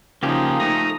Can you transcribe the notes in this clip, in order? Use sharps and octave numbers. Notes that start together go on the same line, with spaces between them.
C#3 F3 A#3 D#4 G4 G#4
A3 A#5 D#6